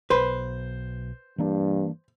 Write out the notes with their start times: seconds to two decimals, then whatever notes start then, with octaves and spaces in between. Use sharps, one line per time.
0.10 B1 B4 C5
1.38 G2 E3 A#3 D4